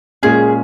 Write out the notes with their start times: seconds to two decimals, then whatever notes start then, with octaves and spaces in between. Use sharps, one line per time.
0.23 A#2 G#3 C#4 G#4